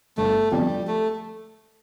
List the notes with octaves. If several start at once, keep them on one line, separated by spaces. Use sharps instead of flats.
G1 A3
F2 D3 F3 G3
A3